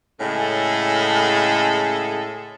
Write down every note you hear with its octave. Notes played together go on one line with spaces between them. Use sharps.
A2 C#3 G#3 C#4 G#4 A4